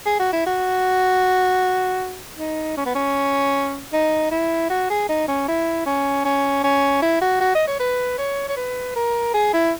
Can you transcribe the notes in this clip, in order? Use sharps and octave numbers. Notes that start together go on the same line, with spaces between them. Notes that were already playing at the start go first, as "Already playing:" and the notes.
G#4
F#4
E4
F#4
D#4
C#4
B3
C#4
D#4
E4
F#4
G#4
D#4
C#4
E4
C#4
C#4
C#4
E4
F#4
F#4
D#5
C#5
B4
C#5
C#5
B4
A#4
G#4
E4